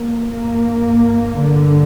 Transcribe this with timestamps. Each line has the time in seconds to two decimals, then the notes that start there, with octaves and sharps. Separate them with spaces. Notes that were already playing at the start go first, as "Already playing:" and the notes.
Already playing: A#3
0.30 G2 A#3
1.35 G2 D3